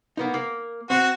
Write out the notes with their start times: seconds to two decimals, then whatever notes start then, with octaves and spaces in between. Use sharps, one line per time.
0.17 A#3 B3 D#4
0.34 A#3
0.90 C4 F#4